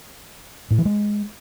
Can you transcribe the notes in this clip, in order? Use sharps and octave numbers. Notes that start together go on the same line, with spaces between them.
A2
E3
G#3